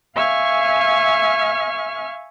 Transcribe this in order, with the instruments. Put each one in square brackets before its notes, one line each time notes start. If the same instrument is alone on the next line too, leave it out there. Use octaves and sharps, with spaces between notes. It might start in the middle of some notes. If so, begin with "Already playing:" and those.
[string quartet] E5 F5 G#5 C#6 F6